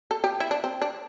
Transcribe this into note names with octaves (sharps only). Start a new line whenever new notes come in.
A4
G4
E4
D4
C4
D4